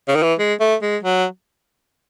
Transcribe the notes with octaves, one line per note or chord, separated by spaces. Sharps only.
C#3
D#3
E3
G#3
A3
G#3
F#3